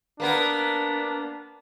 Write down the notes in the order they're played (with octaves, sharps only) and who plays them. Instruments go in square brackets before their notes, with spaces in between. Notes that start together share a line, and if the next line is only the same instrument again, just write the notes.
[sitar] A#3 B3 A#4 [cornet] D4